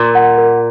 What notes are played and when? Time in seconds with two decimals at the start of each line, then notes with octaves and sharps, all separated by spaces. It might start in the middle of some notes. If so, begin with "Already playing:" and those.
Already playing: A#2 A#4
0.15 F#5
0.38 A#4